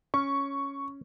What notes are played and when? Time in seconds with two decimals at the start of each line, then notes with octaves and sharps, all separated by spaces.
0.14 C#4 C#6